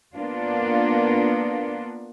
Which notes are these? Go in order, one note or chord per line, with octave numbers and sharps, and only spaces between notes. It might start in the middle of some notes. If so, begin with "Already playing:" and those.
A#3 B3 D4 F4